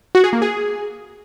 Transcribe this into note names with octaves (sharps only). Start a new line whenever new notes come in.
F#4
G#4
A#3
G#4